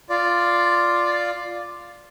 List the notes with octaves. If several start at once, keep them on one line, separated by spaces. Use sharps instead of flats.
F4 D5